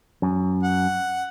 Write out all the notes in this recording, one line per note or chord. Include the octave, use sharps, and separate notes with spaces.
F#2
F#5